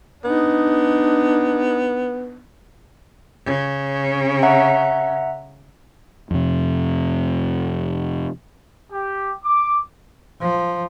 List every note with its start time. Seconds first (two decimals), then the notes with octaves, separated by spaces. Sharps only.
0.24 B3 D4 D#4
3.46 C#3
4.43 E5 F#5 A#5
6.31 F2 C3
8.91 G4
9.44 D6
10.41 F3